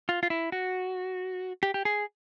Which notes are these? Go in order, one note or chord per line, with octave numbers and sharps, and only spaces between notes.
F4
F4
E4
F#4
G4
G4
G#4